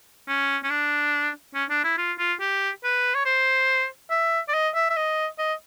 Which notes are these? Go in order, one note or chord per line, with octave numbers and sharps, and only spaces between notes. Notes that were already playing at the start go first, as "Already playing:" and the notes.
C#4
C#4
D4
C#4
D4
E4
F4
F4
G4
B4
C#5
C5
E5
D5
D#5
E5
E5
D#5
D#5